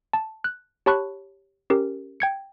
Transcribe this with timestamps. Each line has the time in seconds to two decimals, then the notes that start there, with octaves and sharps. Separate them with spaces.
0.13 A5
0.44 F#6
0.86 G4 C#5 A5 B5 C#6 F#6
1.70 C#4 G4 A#4
2.20 G5 G#6 C#7